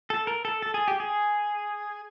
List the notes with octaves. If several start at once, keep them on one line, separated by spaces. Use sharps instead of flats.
A4
A#4
A4
A4
G#4
G4
G#4